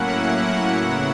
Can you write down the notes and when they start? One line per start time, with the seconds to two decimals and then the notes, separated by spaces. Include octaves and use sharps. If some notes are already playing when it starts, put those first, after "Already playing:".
Already playing: A2 F#3 A#3 C#4 E4 F#5
0.75 C#3 F#3 B3 E4 F#5